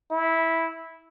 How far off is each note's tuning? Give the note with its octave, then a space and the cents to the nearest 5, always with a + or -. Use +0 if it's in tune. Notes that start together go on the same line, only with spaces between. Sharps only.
E4 -10